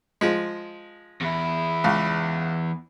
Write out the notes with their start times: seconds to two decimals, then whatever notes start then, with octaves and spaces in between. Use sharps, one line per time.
0.21 F3 G#3
1.21 E2 E4
1.84 C#2